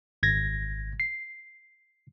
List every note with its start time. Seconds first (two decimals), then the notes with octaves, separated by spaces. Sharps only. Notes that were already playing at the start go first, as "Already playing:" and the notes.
0.23 G#1 G#6 A#6
1.00 C7